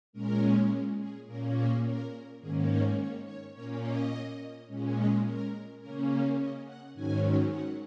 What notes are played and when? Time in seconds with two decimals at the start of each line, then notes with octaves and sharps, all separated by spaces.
0.13 A#2 G#3 C#4 A#4
0.99 G#4
1.27 A#2 A#3 C#4 A#4
1.55 G#4
1.83 A#4
2.40 G#2 D#3 A#3 C#4 G#4
2.68 A#4
2.97 C#5
3.25 C#5
3.54 A#2 A#3 C#4 C#5
3.82 D#5
4.67 A#2 G#3 C#4
4.95 D#5
5.23 A#4
5.80 C#3 A#3 C#4 A#4
6.37 D#5
6.65 F#5
6.94 G#2 D#3 F#3 C#4 G#5
7.51 F#5